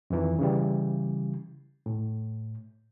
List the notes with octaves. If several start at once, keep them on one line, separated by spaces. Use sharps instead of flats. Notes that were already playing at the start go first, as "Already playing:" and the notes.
F2 D#3 E3
C#3 E3 G3
A2